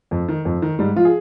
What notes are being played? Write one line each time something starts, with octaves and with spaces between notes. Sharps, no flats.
F2
D#3
F2
D#3
G#2 G3
F3 F4
G#4